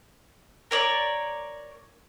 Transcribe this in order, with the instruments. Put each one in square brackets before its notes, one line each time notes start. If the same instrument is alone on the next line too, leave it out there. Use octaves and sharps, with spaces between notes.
[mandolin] A#4 C#5 D5